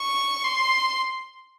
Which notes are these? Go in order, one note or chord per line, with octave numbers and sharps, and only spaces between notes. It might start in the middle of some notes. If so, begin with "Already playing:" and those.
Already playing: C#6
C6